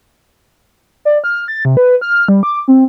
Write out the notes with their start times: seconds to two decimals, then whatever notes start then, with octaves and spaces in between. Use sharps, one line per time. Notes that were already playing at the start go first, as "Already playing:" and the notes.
1.05 D5
1.24 F6
1.48 A6
1.65 C3
1.77 B4
2.01 F6
2.28 G3
2.43 D6
2.68 C4